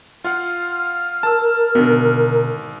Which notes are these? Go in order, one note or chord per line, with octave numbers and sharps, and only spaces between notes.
F4 F5 F#5 F6
A#4 A5 E6
G#1 B2 D3